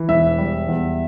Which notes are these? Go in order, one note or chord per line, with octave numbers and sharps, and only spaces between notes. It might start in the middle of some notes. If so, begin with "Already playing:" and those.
Already playing: E3
E1 E5
G3
E2